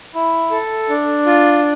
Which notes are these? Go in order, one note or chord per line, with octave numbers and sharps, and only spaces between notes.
E4
A4
D4
F4